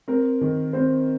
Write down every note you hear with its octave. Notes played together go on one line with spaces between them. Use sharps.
C4 A#4
D#3
C4 C5